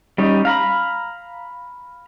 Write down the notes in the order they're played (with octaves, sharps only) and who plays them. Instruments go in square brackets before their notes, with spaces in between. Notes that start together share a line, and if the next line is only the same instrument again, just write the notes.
[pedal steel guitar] G3 C#4 D#4
F5 A#5 B5